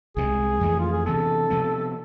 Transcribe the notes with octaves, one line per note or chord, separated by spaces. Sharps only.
C2 C3 E3 G#3 G#4
F2 E3 A3
F4
G#4
C3 E3 B3 A4
C3 F3 B3